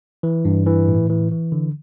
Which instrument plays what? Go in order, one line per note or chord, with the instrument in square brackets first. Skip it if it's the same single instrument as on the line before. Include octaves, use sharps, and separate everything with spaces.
[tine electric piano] E3
G2
E3
A2
E3
E3
D3